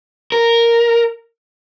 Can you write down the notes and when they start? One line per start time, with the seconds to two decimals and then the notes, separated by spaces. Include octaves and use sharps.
0.32 A#4